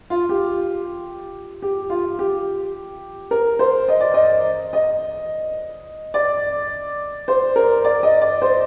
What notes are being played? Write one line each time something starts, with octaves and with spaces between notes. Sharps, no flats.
F4
G4
G4
F4
G4
A#4
C5
D#5
D5
D#5
D#5
D5
C5
A#4
D5
D#5
D5
C5